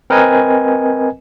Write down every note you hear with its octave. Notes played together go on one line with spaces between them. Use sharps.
C4 A#4 B4 D#5 G#5